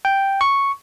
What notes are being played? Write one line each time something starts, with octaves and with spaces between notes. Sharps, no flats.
G5
C#6